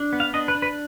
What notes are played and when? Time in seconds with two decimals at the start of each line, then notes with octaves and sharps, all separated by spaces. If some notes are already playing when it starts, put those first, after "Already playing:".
Already playing: D4
0.13 B3
0.20 F5
0.34 D4 D#5
0.48 B4
0.55 D4
0.62 B4